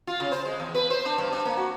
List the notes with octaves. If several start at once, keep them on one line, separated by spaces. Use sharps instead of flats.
F4
C#3
C5
G#3
E2
B4
C5
D4
G2
D4
A#3
F#4